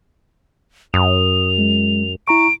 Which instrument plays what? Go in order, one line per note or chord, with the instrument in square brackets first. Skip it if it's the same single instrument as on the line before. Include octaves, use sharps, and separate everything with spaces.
[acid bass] F#2 [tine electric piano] D#6 [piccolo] F7
[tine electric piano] G#3
[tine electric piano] E4 A#5 C#6 [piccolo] D7